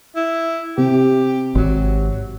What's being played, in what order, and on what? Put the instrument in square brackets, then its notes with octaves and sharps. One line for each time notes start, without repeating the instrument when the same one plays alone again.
[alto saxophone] E4
[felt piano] C3 [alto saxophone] G4
[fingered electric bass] G#1 [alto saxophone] F#3